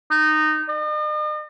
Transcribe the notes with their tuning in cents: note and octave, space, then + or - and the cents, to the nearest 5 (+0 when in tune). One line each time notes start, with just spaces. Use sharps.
D#4 -15
D#5 -45